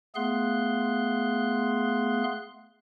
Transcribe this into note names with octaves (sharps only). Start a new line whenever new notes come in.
A3 B3 G#4 F5 C6 F#6